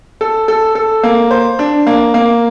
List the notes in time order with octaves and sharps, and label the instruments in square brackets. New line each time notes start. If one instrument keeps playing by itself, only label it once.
[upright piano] A4
A4
A4
A#3
C5
D4
A#3
A#3